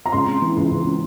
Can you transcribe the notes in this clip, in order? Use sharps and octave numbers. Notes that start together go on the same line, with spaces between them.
A#5
C#2 C6
C#3
E3
C#2
C#2
C#3